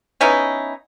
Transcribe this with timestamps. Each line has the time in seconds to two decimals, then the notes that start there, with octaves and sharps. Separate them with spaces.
0.21 B3 C#4 D#4 E4